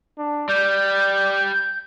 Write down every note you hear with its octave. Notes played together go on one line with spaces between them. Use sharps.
D4
G3 D5 G6